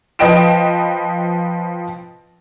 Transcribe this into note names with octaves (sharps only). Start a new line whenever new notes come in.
F3 B4 D#5 G5 D7 E7